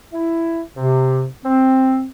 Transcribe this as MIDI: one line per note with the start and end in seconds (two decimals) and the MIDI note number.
0.13 0.63 64
0.77 1.27 48
1.45 2.06 60